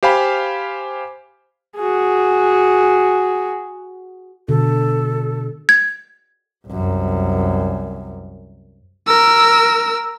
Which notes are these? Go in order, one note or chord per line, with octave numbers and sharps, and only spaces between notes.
G4 C5 F5 G#5 B5
F#4 G#4
B2 D3 A4
G#6
C2 F#2
A#4 E6